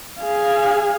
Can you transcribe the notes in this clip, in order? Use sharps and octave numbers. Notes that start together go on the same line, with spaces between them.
G#4 F5